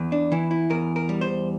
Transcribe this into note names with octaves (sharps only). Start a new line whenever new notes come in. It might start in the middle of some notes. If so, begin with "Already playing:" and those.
Already playing: E2
D4
E3 E4
E4
E2 A#4
A#4
G3
C5